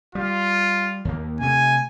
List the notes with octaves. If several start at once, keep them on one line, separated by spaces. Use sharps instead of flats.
G3 F4
D#2 A#3
C3 A3 G#5